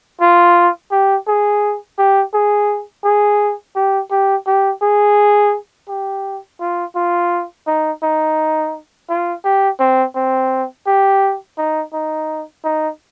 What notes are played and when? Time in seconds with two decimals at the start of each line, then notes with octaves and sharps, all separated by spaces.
0.21 F4
0.91 G4
1.27 G#4
1.98 G4
2.34 G#4
3.04 G#4
3.75 G4
4.11 G4
4.47 G4
4.82 G#4
5.89 G4
6.60 F4
6.96 F4
7.67 D#4
8.03 D#4
9.09 F4
9.44 G4
9.79 C4
10.15 C4
10.86 G4
11.58 D#4
11.93 D#4
12.64 D#4